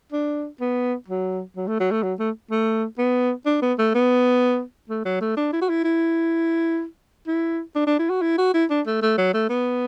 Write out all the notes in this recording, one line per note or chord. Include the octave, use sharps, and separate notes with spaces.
D4
B3
F#3
F#3
A3
F#3
A3
F#3
A3
A3
B3
D4
B3
A3
B3
A3
F#3
A3
D4
E4
F#4
E4
E4
E4
D4
D4
E4
F#4
E4
F#4
E4
D4
A3
A3
F#3
A3
B3